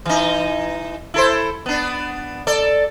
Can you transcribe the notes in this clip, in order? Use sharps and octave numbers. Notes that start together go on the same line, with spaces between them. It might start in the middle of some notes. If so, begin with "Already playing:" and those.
E3 D#4
E4 A4 C5
B3 D4
A4 D5